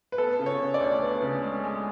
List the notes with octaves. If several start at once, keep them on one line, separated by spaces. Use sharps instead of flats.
B4
B3 A4
C#3
C#5
C#3
D5
D2
B3
C#3
G#3
G#3